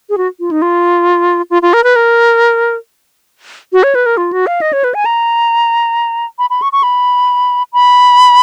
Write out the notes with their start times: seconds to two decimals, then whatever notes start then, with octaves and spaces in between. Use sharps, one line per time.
0.09 G#4
0.18 F#4
0.40 F4
0.51 D#4
0.62 F4
1.50 F4
1.62 F4
1.73 A#4
1.84 B4
1.96 A#4
3.73 F#4
3.83 C#5
3.95 B4
4.06 A#4
4.17 F4
4.33 F#4
4.47 F5
4.61 D#5
4.73 C#5
4.84 B4
4.94 G#5
5.05 A#5
6.39 B5
6.50 B5
6.62 C#6
6.73 C#6
6.83 B5
7.73 B5